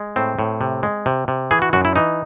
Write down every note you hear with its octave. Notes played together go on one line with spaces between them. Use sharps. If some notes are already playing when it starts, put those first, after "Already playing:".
Already playing: G#3
A2 C4
A2
C3
G#3
C3
C3
E3 G#4
F#4
F#2 F#4
E4
E3 D#4